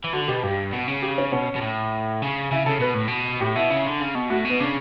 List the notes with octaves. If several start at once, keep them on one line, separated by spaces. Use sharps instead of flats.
E3
D3 F#4
B2 G4
G2 G4
B2
C#3
G4
C#4
B2 C#4
B2
A2
C#3
C#3 E4
C#3 A4
B2 B4
A2
B2
A2 G4
B2 E4
C#3
D3
C#3
B2
A2 F#4
B2
B3
C#3 D4